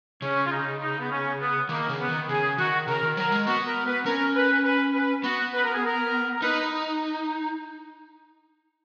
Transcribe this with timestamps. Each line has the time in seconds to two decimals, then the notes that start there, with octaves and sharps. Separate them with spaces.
0.22 C#3 C#4
0.46 F4
0.52 D#4
0.81 D#4
1.00 B3
1.11 C#4
1.40 B3
1.69 D#3 A#3
1.89 C#3
2.00 B3
2.09 D#3
2.29 C#3 G#4
2.58 D#3 F#4
2.88 C#3 A#4
3.03 D#3
3.17 F#3 A#4
3.32 G#3
3.47 B3 F#4
3.66 A#4
3.86 B4
4.06 C#4 A#4
4.36 B4
4.65 B4
4.94 B4
5.24 B3 F#4
5.54 B4
5.64 A#4
5.74 G#4
5.86 A#4
6.36 A#4
6.42 D#4 B4